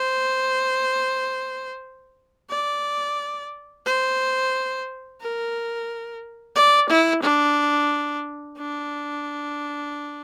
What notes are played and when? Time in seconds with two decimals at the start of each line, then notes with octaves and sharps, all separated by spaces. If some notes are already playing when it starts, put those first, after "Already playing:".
Already playing: C5
2.50 D5
3.86 C5
5.21 A#4
6.56 D5
6.89 E4
7.23 D4
8.58 D4